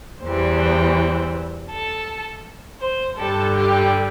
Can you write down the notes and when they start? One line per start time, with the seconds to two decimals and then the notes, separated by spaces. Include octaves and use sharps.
0.23 E2 E3 G3 C5
1.70 A4
2.81 C5
3.18 G2 D3 G3 A4
3.54 G4